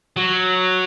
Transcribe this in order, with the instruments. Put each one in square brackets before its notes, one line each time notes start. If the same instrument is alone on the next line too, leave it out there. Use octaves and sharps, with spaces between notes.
[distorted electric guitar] F#3